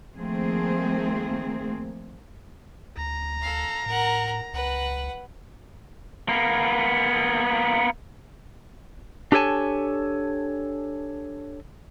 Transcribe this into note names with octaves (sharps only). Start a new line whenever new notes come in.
D#3 F3 A3 A#3 C4 G#4
D2 A#5
A4 F5
A2 A#4 F#5
C#2 B4 F#5
A#3 B3
D4 G4 A4 C#5 G#5 A5